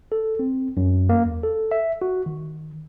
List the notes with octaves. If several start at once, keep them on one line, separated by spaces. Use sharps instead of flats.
A4
C4
F#2
A#3
E2
A4
E5
F#4
D#3